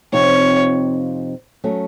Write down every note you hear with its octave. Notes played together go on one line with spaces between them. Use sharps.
F2 C3 F3 C4 D#4 C#5
F#3 A3 C#4